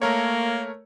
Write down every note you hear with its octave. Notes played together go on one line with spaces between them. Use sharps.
A3 A#3 A#4 C#5